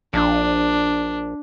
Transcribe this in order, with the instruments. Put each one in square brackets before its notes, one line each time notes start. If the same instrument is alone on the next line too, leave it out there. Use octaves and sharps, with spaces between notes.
[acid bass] A#1 [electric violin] D4